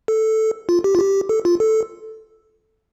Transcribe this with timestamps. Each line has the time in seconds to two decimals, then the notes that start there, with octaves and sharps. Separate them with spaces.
0.08 A4
0.69 F4
0.84 G4
0.95 F4
0.99 G4
1.29 A4
1.45 F4
1.60 A4